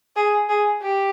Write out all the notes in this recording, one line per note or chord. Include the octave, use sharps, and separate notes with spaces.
G#4
G#4
G4